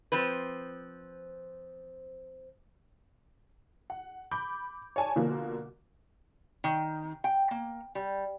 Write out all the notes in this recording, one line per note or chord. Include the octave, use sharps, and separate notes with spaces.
F3 C4 B4
F#5
B5 D6 G6
C#5 D5 G#5 A5
B2 D3 F3 A#3
D#3
G5
A#3
G3